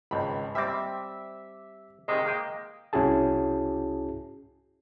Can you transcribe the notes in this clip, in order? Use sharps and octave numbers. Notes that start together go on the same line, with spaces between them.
G#1 C#2 B5
G3 C4 E5 D6
C3 D#3 G#3
A#3 D#5 G5
C2 C#4 E4 F#4 G#4 A5